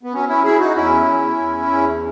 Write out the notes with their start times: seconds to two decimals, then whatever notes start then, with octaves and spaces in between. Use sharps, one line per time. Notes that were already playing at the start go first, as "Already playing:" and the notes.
0.03 B3
0.13 F#3 C#4
0.29 C#4 E4
0.44 F#3 E4 G#4
0.59 D#4 F#4
0.75 E2 C#4 E4
1.05 E2
1.36 E2
1.66 E2